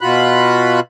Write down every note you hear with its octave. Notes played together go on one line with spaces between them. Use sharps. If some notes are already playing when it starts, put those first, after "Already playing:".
B2 F4 F#4 B5 F#6